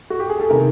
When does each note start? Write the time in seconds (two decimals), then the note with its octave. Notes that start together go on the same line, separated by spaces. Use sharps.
0.10 F#4
0.20 G4
0.30 G#4
0.40 A4
0.49 C3 D#3 A#4